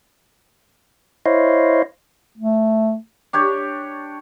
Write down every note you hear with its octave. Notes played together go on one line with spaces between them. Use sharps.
E4 C5 C#5 D#5 F5
A3
D4 G4 C#5